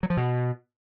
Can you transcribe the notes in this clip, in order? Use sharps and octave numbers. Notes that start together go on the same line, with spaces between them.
F#3
F3
B2